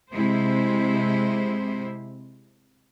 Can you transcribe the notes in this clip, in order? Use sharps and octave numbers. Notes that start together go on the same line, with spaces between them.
C3 G#3 E4 C5